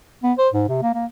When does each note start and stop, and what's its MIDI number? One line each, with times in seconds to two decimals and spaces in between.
0.23 0.33 59
0.38 0.49 72
0.53 0.64 44
0.69 0.80 48
0.82 0.91 58
0.94 1.06 58